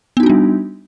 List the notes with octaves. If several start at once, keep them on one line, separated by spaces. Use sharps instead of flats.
G3 B3 D4 D#4 F#4